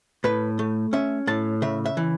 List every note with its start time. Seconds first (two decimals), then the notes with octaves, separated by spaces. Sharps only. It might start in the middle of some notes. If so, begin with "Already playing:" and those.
0.24 A2 B4
0.59 A3
0.93 C#4 E5
1.27 A2 A5
1.62 C#3 E5
1.86 E5
1.97 E3